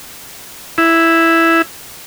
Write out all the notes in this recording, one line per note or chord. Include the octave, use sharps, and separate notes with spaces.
E4